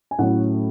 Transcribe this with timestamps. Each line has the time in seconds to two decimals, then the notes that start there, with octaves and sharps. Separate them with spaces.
0.11 G#5
0.19 A2 F#3 C#4 E4 F#5